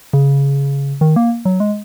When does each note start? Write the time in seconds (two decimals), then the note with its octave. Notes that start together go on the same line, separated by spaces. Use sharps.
0.13 C#3
1.01 D#3
1.16 A#3
1.45 F#3
1.60 G#3